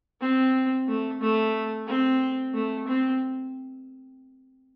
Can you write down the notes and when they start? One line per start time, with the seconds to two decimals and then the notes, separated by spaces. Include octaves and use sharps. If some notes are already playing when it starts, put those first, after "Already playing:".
0.21 C4
0.88 A3
1.21 A3
1.87 C4
2.54 A3
2.87 C4